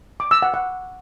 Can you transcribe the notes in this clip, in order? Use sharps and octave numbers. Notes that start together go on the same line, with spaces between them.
D6
E6
F#5
F#5